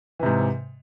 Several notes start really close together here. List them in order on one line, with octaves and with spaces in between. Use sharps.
E3 C3 G#2